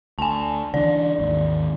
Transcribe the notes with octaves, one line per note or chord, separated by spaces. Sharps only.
D2 G#5 A5
D3 E3 D4 D5
G#1 D#2